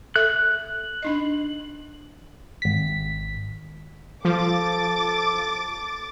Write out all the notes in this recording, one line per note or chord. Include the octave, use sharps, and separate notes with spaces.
A4 E5 F#6
D4 D#4 D#5
G#1 B6
F3 A4 D6 A6